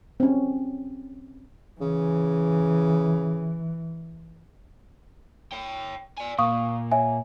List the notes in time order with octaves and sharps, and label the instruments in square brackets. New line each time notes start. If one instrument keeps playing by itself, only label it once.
[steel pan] C4 C#4
[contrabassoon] C#3 [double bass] E3
[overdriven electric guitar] C#5 G5
D5 G#5
[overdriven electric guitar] A#2 [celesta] F5 C#6 D#6
[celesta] C#5 E5 G#5